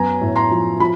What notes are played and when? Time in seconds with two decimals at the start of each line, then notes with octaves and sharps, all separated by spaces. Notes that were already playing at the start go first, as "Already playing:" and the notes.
Already playing: F#2 B3 G#5 A#5
0.21 A2
0.36 A#5 C6
0.51 F3
0.80 F3 B5